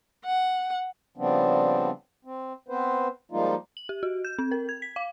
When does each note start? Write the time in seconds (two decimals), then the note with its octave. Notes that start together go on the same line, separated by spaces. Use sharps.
0.25 F#5
1.17 C#3 F3 G3 B3 C4 D4
2.25 C4
2.68 B3 C4 B4 C5
3.32 F3 G3 G#3 A#3 D#4 F4
3.77 F#7
3.89 G4
4.03 F#4
4.25 G6
4.39 C4
4.51 A#4
4.69 G#6
4.82 B6
4.96 F5